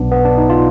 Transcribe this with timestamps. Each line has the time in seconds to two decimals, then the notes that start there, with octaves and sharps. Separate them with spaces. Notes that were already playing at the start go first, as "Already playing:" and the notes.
Already playing: B1 B2 F#3 B3 D4
0.12 B3
0.25 D4
0.37 D#4
0.50 F4